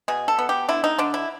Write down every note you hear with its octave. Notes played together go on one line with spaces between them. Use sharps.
B2 G#4
A4
B3
G4
D3 E4
D#4
D3 D4
E4